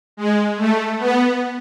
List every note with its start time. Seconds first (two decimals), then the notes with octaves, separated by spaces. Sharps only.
0.17 G#3
0.57 A3
0.98 B3